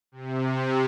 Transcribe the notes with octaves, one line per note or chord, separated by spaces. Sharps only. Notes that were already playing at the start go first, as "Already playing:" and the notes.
C3